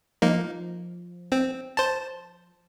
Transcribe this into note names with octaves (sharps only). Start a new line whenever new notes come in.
F3 A#3 D#4
C4
C5 A5